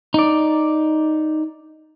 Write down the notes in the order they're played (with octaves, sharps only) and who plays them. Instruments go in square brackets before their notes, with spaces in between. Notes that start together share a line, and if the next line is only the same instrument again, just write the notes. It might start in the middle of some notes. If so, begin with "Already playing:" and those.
[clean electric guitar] D#4 D5